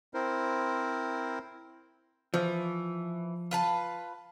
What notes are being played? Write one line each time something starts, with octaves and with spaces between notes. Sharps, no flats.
C4 E4 A#4 C5
E3 F3
F4 B4 A5